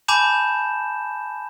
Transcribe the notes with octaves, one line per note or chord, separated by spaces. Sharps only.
G#5 A5 B5 D6 G6 E7